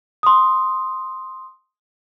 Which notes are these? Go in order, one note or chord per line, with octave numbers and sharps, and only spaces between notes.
C6 D#6